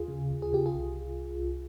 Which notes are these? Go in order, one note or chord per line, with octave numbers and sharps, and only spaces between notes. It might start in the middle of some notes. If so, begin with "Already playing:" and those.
Already playing: D#2 F4 G#4
C#3
D#2
G#4
C#3 G4
F4 G#4
C2